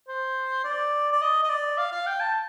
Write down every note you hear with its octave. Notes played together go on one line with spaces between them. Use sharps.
C5
D5
D5
D#5
D#5
D5
F5
F5
G5
A5